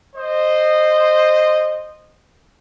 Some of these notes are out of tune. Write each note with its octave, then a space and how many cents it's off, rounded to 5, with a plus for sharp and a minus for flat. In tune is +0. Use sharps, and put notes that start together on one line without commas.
C5 +0 D#5 -15